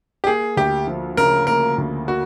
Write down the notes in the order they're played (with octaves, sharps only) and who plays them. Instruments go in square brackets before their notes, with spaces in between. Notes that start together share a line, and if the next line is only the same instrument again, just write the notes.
[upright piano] G4
[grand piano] A#3 [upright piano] G#4
[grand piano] D2 [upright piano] G4
[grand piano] F3
[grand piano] C#3 [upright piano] A#4
[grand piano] A#3 [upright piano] A#4
[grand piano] D2
[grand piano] A#3 [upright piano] F#4